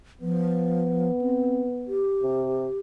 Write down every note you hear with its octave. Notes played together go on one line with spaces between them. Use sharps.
F3 B3
C4
G4
C3